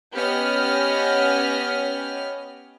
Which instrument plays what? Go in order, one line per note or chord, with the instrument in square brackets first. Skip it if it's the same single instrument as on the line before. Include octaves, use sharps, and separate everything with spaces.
[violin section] B3 C#4 G4 C#5 D#5 F6